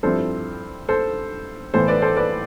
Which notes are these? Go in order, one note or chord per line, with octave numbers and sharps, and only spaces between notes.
G2 F3 C4 E4 A4 C5
A4 C5
A2 E3 B3 A4 C5
B4 D5
A4 C5
B4 D5